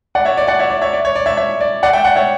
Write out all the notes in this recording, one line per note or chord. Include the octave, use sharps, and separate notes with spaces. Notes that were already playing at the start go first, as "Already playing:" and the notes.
D5 F#5
C#5 E5
D5
D5 F#5
C#5 E5
D5
C#5 E5
D5
C#5
D5
C#5 E5
C#5 E5
D5
D5 F#5
E5 G5
D5 F#5
C#5 E5